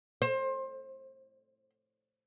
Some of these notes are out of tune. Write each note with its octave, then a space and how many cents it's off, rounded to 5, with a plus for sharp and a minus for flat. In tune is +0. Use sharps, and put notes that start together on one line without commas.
C5 +25